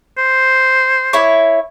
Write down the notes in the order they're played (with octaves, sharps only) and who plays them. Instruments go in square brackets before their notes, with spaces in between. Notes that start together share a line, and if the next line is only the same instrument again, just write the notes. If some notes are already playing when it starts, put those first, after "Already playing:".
[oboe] C5
[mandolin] E4 C#5